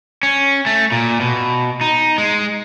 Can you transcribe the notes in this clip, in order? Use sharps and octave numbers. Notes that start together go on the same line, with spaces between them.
C#4
A3
A#2
B2
D#4
G#3